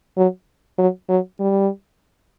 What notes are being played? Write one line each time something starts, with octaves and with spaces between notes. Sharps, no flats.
F#3
F#3
F#3
G3